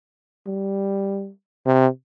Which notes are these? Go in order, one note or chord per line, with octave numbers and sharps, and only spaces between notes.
G3
C3